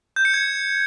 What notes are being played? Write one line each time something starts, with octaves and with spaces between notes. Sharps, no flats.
G6
C#7
G#6